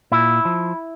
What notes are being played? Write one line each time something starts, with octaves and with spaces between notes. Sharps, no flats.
A#2 E4
F3